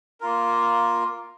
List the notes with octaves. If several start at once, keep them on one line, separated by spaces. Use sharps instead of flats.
A#3 F4 A#4